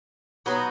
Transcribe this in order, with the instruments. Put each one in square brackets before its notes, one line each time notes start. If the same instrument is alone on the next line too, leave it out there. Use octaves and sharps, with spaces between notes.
[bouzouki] F#3 B3 D#4